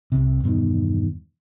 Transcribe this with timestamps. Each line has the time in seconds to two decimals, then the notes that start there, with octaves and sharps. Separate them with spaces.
0.12 C2 C3
0.43 E2 G2 B2 D#3